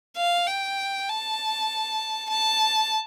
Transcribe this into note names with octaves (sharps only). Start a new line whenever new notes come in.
F5
G5
A5
A5